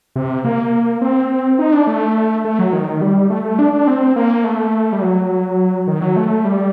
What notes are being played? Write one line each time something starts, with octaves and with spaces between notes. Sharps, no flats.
C3
A#3
C4
D#4
D4
A3
A3
F#3
D#3
G3
A3
A3
D4
D4
C4
A#3
A3
G3
F#3
D#3
F#3
A3
G3